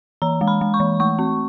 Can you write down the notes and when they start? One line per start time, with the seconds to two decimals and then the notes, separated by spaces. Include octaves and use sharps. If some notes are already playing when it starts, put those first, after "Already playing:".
0.22 E3 A#5
0.41 G#3
0.48 B5
0.61 G#3
0.74 C#6
0.80 E3
1.00 A3 C#6
1.19 C4